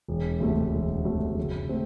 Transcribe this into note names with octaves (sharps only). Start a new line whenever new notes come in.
E1
D2 C3 F#3 A3
E1
D2 C3 F#3 A3
F#1
A3 C4